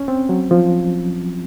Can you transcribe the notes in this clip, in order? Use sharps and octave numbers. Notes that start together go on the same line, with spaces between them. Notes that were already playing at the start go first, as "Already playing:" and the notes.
Already playing: C#4
C4
F#3
F3